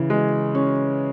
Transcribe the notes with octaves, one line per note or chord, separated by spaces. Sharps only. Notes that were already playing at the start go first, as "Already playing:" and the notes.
Already playing: C#3 E3
G#3
C#4